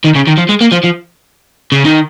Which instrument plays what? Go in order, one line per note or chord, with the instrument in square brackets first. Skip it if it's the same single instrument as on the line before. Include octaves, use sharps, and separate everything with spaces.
[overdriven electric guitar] D#3
C#3
D#3
F3
G#3
A#3
F3
F3
C#3
D#3